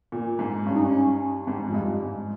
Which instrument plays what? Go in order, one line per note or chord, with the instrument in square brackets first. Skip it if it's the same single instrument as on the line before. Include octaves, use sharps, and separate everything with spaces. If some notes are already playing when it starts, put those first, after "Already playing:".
[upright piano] A#2
G#2
[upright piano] G2 [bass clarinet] C#4
[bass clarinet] D#4
C#4
[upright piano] G#2 [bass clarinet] C4
[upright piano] F2
[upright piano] G2 [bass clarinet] G#3
[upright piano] G#2